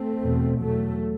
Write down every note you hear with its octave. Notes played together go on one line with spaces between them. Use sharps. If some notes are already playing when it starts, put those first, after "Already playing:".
Already playing: A3 C4
E2 B2
E2 B2 F#3 A3